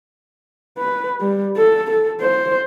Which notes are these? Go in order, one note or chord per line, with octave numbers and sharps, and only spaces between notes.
B4
G3
A4
A4
C5